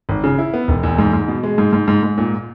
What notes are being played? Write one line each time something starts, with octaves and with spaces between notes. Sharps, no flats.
G#1
C#3
E4
B3
E1
E2
G#2
G#2
B2
G#3
G#2
G#2
G#2
G#2
A#2